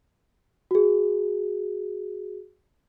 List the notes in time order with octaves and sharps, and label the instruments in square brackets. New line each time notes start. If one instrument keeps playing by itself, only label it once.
[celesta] F#4 G#4